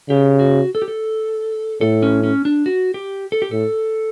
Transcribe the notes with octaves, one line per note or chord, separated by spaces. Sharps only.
C#3 G4
F#4
A4
G4
A4
A2 A4
C#4
C#4
D4
F#4
G4
A4
G4
A2 A4